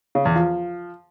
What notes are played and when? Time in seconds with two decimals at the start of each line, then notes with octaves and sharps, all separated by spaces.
0.15 C#3
0.25 E2
0.36 F3